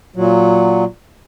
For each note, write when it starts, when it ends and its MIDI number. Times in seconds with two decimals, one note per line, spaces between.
0.16 0.84 46
0.16 0.84 54